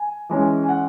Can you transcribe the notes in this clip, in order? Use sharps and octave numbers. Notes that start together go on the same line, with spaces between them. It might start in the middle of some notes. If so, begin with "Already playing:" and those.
Already playing: G#5
E3 G#3 C#4
G#5
F#5